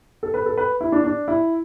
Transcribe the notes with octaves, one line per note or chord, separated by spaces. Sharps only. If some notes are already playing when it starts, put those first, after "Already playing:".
A4
B4
A4
B4
E4
D4
D4
E4